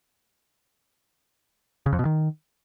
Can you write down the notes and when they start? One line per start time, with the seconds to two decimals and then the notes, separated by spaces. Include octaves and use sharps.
1.86 C#3
1.93 F2
1.99 B2
2.05 D#3